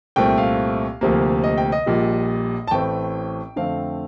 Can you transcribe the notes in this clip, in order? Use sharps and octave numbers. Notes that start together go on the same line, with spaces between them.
C2 A#2 A3 C4 G5
F5
D2 C3 F3 A#3
D#5
G5
D#5
A#1 A#2 G3
A5
A1 A2 A3 C4 G5
F2 D3 A3 C4 F5